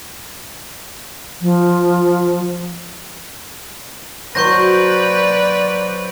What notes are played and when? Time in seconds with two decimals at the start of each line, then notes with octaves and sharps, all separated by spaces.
1.42 F3
4.35 F#3 B4 C5 D5 C#6 G6 A#6